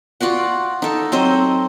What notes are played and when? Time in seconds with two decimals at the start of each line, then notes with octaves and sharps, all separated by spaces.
0.21 F4 F#4 D5 F#5
0.82 D#4 A4
1.12 F#3 C4 C5 D#5